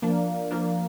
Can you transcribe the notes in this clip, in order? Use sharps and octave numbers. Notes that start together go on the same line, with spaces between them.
F3 A#3 D4
F3 A#3 D4